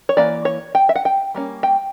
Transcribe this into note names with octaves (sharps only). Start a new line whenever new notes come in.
C#5
E3 A#3 D5
C#5
G5
E5
F#5
G5
G3 A#3 C#4
G5